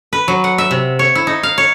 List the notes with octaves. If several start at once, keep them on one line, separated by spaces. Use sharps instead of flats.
B4
F#3
F#5
E5
C3
C#5
E4
D#4
F5
C#5